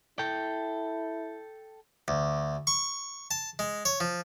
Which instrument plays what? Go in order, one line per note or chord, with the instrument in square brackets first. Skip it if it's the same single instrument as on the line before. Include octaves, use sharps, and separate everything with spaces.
[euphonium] E4 [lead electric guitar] A4 G5
[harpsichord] D2
C#6
A5
G#3
C#5
F3